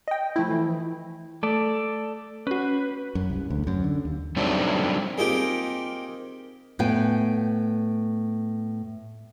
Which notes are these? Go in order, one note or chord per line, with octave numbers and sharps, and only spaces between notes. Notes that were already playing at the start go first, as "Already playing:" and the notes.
D#5 G5
F3 A3 E4
E3
A3 A4 D5
C#4 F#4 B4
F#2
C2
D2
F#2
D3
D#2
F#3 G3 A3 C4 D4 D#4
A#3 C4 D#4 F4 G4 G#4
A2 B3 G5 G#5